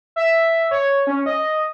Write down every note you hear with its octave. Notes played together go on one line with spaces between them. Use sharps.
E5
C#5
C#4
D#5